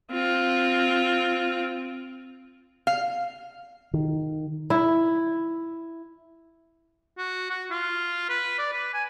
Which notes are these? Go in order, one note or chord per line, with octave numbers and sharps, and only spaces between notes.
C4 F4
F5
D#3
E4
F#4
F#4
F4
B4
D5
B4
G#5